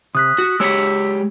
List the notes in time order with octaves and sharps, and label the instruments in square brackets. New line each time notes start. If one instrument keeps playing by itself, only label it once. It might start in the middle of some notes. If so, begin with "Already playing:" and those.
[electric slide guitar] C3 [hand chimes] D#6 F#6 B6
[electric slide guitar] F#4
[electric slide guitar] G#3 G4 C#5 [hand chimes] E6 B6